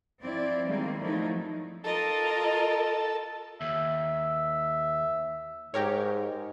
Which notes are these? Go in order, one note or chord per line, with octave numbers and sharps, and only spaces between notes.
F3 C4 E4 D5
D#3 G3 G#3 A#3 C4
F3 F#3 A3 D#4 E4
F4 A4 A#4 D#5
D#2 E5
G#2 G4 A#4 C#5